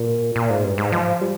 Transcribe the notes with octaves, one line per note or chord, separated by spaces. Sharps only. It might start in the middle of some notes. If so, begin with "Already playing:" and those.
Already playing: A#2
A#2
G#2
G2
G#2
F3
G3